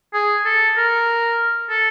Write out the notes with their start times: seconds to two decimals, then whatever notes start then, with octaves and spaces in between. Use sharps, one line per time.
0.14 G#4
0.45 A4
0.77 A#4
1.70 A4